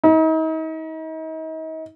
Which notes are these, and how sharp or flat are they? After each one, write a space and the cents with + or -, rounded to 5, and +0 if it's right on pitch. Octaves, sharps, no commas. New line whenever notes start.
D#4 +40